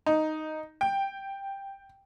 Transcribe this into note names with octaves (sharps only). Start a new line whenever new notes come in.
D#4
G5